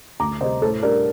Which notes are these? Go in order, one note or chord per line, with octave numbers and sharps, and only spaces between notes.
D2 A#5 D6
C3 G3 C5 D#5
A2 A4 C5
G3 D4 A#4 D5